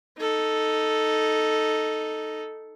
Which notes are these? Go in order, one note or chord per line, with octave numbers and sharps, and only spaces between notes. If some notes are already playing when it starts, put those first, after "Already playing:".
D#4 A4